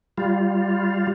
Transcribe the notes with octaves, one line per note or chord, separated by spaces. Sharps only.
G3 F4